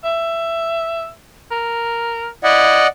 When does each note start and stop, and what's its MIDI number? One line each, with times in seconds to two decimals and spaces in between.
0.04 1.09 76
1.51 2.28 70
2.44 2.81 64
2.44 2.87 74
2.44 2.87 75
2.44 2.87 78